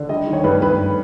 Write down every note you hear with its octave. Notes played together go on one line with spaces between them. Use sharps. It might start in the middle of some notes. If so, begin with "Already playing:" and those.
Already playing: D3
G3 D#5
D#3
C#5
G2 B4
G2 B4